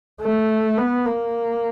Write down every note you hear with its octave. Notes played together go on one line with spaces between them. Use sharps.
A3
B3
A#3